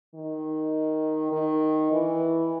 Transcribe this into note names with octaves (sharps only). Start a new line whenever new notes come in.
D#3
D#3
E3